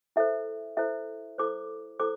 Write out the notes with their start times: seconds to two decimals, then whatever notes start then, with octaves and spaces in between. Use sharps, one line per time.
0.16 E4 A4 C5 E5
0.77 E4 A4 C5 E5
1.38 E4 A4 C5 D6
2.00 E4 A4 C5 D6